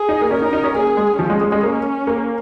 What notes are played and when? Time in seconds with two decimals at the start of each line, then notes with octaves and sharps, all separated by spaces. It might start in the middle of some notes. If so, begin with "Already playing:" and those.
Already playing: G#4
0.09 D#4
0.22 A#3
0.30 C#4 A#4
0.42 D#4
0.53 D#4
0.64 C#4
0.75 A#3 G#4
0.97 G#3
1.19 F3 C#4
1.30 G#3
1.41 G#3
1.52 G#3
1.63 A#3
2.07 A#3